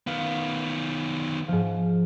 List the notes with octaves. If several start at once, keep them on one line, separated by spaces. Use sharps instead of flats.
D#3 B3 F5
G#2 F3